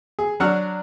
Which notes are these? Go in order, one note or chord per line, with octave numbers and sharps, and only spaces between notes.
G#4
F#3 D4 F#5 C#6 E6 F6